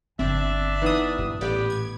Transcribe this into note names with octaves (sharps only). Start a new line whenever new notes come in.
G1 D3 C4 D4 E5
E3 B3 D#4 D#6
G2 A#2
A1 B3 G4 D5
G#6